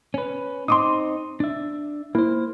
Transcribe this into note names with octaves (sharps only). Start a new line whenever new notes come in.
C#4 B4
C4 D#4 C6 D6 D#6
D4 E5
A#3 E4 C5